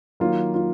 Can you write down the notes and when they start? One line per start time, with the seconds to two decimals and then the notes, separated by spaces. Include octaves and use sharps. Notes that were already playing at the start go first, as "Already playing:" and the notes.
0.20 D#3 F#3 A#3 F4
0.54 F4